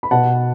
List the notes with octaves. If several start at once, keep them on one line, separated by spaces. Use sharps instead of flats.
B5
B2 F#5 A5